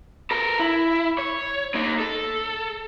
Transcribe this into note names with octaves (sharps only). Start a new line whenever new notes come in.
A4 A#4
E4
C#5
A#3 D#4
A4